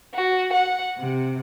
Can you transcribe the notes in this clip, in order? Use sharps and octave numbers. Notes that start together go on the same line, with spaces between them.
F#4
F#5
C3